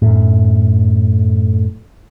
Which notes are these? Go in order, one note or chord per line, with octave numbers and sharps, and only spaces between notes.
F#2 A2